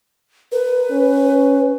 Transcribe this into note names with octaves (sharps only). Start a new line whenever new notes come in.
A#4 B4
C#4